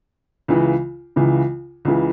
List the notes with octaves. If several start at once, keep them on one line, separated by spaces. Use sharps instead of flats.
C#2 C#3 E3
C#2 C#3 E3
C#2 C#3 E3